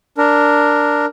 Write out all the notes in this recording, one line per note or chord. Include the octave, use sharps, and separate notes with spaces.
D4 A#4